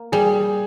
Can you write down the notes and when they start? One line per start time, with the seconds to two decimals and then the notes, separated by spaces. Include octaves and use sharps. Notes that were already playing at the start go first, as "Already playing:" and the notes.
Already playing: A#3
0.12 G3 G#4